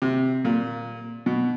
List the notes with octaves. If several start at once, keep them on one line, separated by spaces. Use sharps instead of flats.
C3
A#2
B2